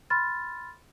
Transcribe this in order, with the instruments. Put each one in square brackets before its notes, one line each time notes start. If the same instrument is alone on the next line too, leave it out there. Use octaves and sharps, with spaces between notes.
[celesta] B5 C6 F6 A6